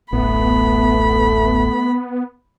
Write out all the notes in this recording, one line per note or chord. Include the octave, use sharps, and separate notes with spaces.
D1 A1 A3 B3 B5